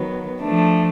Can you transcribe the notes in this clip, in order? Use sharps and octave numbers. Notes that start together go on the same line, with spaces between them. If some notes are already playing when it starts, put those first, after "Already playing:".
Already playing: D#3 F#3 B3
F3 A3 D4